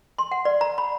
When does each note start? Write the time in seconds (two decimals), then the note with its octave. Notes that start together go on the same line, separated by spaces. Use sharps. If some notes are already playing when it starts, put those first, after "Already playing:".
0.18 C6
0.32 F#5
0.45 D5
0.61 A#5
0.78 B5